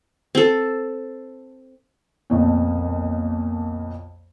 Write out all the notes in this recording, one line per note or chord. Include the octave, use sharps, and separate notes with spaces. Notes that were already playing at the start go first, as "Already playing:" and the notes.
C4 A4
B1 F2 A#2